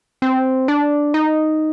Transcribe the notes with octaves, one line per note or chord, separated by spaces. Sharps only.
C4
D4
D#4